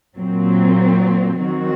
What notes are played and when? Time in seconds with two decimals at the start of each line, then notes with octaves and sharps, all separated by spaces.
0.17 A#2 F#3 C4
1.41 D#3 F#3 C4 F#4